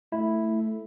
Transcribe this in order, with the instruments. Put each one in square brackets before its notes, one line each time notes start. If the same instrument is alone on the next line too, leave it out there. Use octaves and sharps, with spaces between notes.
[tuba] A3 [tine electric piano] E4